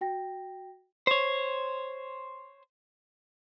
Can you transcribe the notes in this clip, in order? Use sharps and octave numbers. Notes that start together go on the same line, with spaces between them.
F#4 G5 A#6
C5 C#5